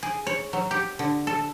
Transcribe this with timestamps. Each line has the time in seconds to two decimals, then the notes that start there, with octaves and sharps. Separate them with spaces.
0.03 G#4
0.27 C#5
0.53 F#3
0.71 G4
0.99 D3
1.27 A4